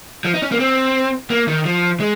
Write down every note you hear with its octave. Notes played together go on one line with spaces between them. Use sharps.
F3
D#4
C#4
A#3
C4
A#3
D#3
F3
G#3